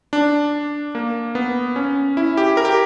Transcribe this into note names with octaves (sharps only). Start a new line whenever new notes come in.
D4
A#3
B3
C#4
E4
G4
A#4
G4